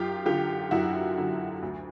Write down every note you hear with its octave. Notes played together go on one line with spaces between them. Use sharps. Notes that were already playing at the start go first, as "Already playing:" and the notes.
Already playing: F#2 F4 G4
D3 F#3 F4 G4
F#2 E4 F#4
D3 F#3
D2